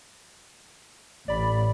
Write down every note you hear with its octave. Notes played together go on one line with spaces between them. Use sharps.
A1 A2 D5 B5